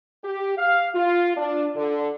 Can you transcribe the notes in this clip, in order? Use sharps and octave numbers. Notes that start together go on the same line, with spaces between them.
G4
F5
F4
D4
D3